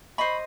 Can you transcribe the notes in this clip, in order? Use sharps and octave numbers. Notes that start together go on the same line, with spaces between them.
C5 D#5 B5 C#6